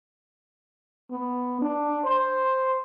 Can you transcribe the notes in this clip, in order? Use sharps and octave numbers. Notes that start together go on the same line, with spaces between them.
B3
D4
C5